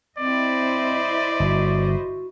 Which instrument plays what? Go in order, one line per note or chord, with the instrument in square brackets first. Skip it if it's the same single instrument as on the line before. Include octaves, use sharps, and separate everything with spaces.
[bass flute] C4 [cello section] E4 C5 D#5 [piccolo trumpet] D5
[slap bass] G1 [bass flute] F#4